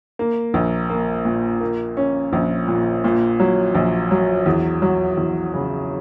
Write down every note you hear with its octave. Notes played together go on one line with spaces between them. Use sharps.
A#3
A#1
A#3
A#2
A#3
C#4
A#1
A#2
A#2
F#3
A#1
F#3
E2
F#3
E2
C#3